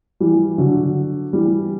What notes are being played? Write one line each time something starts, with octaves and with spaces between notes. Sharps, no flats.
E3 G3
D3 F#3
E3 G3